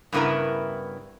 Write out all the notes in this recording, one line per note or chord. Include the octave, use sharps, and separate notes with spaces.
G2 C#3 B3 E4 A#4 A#5